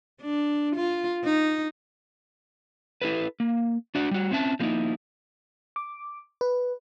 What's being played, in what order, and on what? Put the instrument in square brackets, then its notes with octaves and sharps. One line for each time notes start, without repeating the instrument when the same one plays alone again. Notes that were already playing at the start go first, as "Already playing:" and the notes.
[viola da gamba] D4
F4
D#4
[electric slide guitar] E4 G4 A4 B4
A#3
D4 F#4 D5
G3 F#4
C4 C#4 E5 A5
F3 G#3 A#3 B3 D#4 E4
[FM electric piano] D6
B4